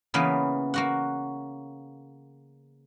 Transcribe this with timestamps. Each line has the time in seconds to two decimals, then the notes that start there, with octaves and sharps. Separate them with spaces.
0.14 C#3 E3 A#3 B3
0.74 A#3 F#4 F#5